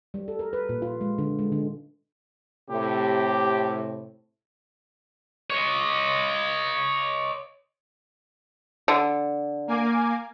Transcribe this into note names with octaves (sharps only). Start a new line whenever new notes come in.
G3
A4
A#4
B4
A#2
F4
G#3
D3
G#3
D3
A2 C3 G4
C#5 D#5
D3
A#3 G#5 D6